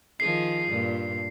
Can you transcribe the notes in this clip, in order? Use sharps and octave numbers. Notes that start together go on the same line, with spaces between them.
D#3 F3 G#4 C7
G2 A#2